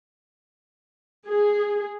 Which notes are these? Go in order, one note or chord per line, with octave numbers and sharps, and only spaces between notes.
G#4